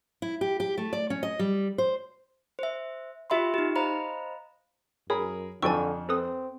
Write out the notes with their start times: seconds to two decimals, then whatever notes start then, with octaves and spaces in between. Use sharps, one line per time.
0.22 E4
0.41 G4
0.60 G4
0.78 A3
0.93 D5
1.10 C#4
1.23 D#5
1.39 G3
1.78 C5
2.59 C5 E5
3.30 F4 G4 E5 B5 C6
3.54 D#4 G4
3.76 C5 D#5 F5 A#5 B5
5.10 F#2 G#4 A#4 C#5 B5
5.62 F2 D3 F3 D5 G5 G#5 C#6 E6
6.09 C4 A4 B4 D#6